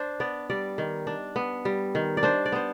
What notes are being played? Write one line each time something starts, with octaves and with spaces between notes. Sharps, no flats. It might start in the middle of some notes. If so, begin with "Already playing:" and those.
Already playing: D4 C5
B3 D5
G3 D5
D#3
D4
B3
G3
D#3
D5
D4 C5
D5
B3 C5